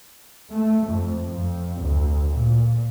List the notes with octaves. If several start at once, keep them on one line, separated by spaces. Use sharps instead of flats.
A3
F2
F2
D2
A#2